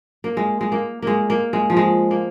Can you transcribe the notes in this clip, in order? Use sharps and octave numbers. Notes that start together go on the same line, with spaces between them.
A#3
G#3
G#3
A#3
G#3 A#3
A#3
G#3
F3
G#3
A#3